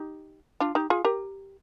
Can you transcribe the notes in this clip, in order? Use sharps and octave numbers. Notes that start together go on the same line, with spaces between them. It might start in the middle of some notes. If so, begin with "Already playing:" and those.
Already playing: D#4 G4
D4 F4
D#4 G4
F4 G#4
G4 A#4